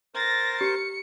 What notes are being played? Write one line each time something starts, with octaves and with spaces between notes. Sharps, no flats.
A#4 C5 A6 A#6
G4 C#7